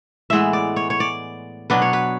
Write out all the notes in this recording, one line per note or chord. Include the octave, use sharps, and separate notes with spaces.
A2 E3 G#3 B3 E5
D5
C#5
C#5
D5
B2 F#3 B3 D4 B4
C#5
B4